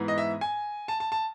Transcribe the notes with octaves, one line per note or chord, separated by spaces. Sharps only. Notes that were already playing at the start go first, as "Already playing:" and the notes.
Already playing: G#2 E3 B3
D#5
E5
G#5
A5
A5
A5